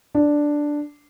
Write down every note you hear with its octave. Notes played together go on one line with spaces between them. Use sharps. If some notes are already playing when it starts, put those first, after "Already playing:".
D4